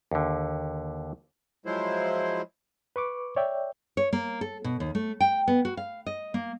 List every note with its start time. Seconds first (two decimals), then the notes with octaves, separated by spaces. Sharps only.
0.11 D#2 D3
1.66 F3 F#3 G#3 E4 C5
2.96 B4 C#6 D6
3.36 C#5 D5 E5 G5
3.97 C#5
4.13 A#3
4.41 A4
4.64 B2
4.80 D#2
4.95 A3
5.20 G5
5.48 B3
5.65 F#4
5.77 F5
6.06 D#5
6.34 A#3